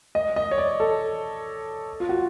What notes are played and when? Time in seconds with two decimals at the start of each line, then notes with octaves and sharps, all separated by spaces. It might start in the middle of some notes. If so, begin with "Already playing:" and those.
0.15 D#5
0.36 D#5
0.51 C#5
0.58 D5
0.80 A4
2.00 F4
2.09 F#4